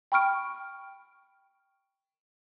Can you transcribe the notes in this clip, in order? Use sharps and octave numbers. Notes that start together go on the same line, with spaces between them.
G5 B5 C#6 F6 D7